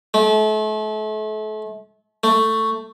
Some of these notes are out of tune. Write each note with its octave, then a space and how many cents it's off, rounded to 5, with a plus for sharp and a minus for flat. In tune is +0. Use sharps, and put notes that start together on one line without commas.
A3 -35
A3 +15